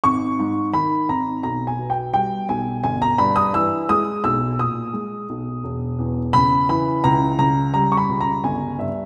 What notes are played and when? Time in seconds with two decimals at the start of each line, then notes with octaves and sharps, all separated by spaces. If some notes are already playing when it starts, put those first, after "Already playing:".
0.04 G#1 C#6
0.39 G#2
0.74 D#3 B5
1.08 G#1 A#5
1.43 B1 A#5
1.67 G#5
1.78 B2
1.90 G5
2.14 G3 G5
2.49 B1 G#5
2.84 G1 G#5
3.02 A#5
3.18 G2 B5
3.36 D#6
3.53 E3 E6
3.89 G#3 D#6
4.24 B1 E6
4.59 A#2 D#6
4.93 G#3
5.29 B1
5.64 E1
5.99 E2
6.33 C#3 B5
6.69 E3 B5
7.04 C#2 A#5
7.39 C#3 A#5
7.74 G3 A#5
7.92 C#6
7.97 B5
8.09 C#2
8.21 A#5
8.44 G1 G#5
8.78 G2 E5